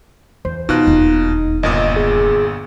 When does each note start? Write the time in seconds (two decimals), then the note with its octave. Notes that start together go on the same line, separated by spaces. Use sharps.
0.45 E2 C5
0.69 B2 D#3 D#4 F4 F#6
0.87 E1 D#2
1.63 G1 A#2 D#5 D#6
1.96 G#4